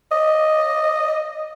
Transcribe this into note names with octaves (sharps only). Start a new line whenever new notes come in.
D#5